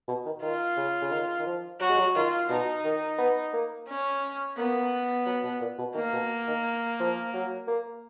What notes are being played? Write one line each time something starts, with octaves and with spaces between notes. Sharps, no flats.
B2
D#3
D#3 F4
C#3
C#3
D#3
D#3
F3
F#3 F#4
G#3
F#3
D#3 F4
B2 D#4
D#3
B3
A#3
C#4
A#3 B3
F#3
B2
A#2
B2
D#3 A#3
B2
D#3
F3
F#3
A#3